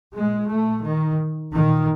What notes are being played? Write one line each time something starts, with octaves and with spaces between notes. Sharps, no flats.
A#2 G#3
A3
D#3
A#2 D#3